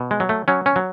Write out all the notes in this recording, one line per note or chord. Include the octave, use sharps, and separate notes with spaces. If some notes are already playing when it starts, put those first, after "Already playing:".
Already playing: B2
G#3
F#3
A3
F#3 C#4
C#4
F#3